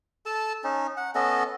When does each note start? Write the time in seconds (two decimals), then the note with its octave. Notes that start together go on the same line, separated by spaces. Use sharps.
0.26 A4 A5
0.64 C#4 D#4
0.97 F#5
1.15 B3 C#4 A4 D#5